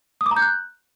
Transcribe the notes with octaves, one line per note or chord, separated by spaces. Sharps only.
D#6
D6
A#5
G6
F#6